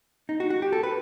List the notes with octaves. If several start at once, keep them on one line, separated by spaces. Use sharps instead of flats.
D#4
F#4
F#4
G4
A4
B4